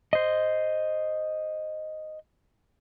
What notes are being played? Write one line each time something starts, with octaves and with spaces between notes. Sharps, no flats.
C5 D#5